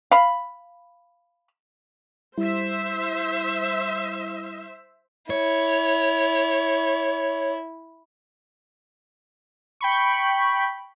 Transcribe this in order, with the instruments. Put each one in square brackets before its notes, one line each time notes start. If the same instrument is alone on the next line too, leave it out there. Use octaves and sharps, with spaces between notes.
[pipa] F5 B5
[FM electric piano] G3 E4 [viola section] C5 E5
[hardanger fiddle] E4 [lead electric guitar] C#5
[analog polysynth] G5 B5 C#6